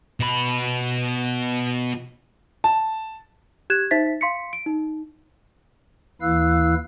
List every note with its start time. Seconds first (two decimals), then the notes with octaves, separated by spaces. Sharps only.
0.20 B2 B5
2.64 A5
3.70 G4 F#6 G#6 E7
3.91 D#4 C5 E5 A6 B6
4.21 F5 C6 B6 C#7
4.53 D7
4.66 D#4
6.21 D#2 E3 E4 F5 E6 F#6